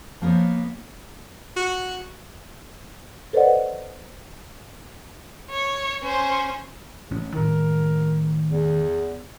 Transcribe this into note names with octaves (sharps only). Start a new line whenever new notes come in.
F3 A#3 B3 C5 C#5
F#4
A4 B4 C5 D5 D#5 F#5
C#5
C#4 C5
A1 C#4
A2 D#3 A#4
E2